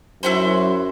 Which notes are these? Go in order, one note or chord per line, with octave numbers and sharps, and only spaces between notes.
F#2 E4 F#4 C5